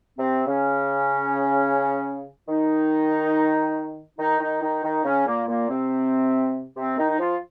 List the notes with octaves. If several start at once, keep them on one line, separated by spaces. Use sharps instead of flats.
C3 C4
C#3 C#4
D#3 D#4
D#3 D#4
D#3 D#4
D#3 D#4
D#3 D#4
C#3 C#4
A#2 A#3
A#2 A#3
C3 C4
C3 C4
D#3 D#4
D#4
F3 F4